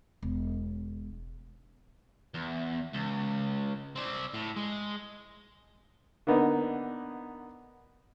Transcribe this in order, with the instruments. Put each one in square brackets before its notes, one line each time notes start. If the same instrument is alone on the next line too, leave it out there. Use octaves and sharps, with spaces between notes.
[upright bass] E1
[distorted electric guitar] E2
C#2
C4 D5
A2
G#3
[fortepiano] D3 A#3 B3 D#4